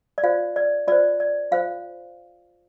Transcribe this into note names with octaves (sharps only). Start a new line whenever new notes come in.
D5
F4 C5 F5
D5
F4 C5 D5
D5
F4 C5 F5